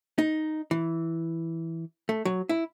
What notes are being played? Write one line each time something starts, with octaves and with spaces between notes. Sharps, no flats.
D#4
E3
A3
F#3
E4